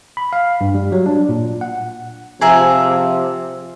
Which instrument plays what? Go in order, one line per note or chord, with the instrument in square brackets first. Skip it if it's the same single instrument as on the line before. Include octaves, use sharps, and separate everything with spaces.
[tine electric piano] B5
F5
G2
G3
F#3
D4
A#2
F#5
[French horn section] C3 F3 [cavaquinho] G#4 E5 A#5